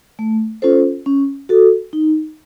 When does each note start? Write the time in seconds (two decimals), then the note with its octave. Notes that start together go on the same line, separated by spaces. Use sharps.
0.19 A3
0.62 C#4 F4 A4 C5
1.06 C#4
1.49 F#4 A4
1.93 D#4